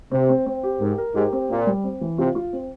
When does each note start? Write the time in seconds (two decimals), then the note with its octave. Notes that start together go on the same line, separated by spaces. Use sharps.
0.11 C3 C4
0.29 C4
0.46 C4
0.63 G4
0.81 G#2 A#4
0.98 A#4
1.15 G#2 G4
1.33 C4
1.50 A#2 C4
1.67 G3
1.84 C4
2.01 E3
2.18 C3 F4
2.35 F4
2.53 C4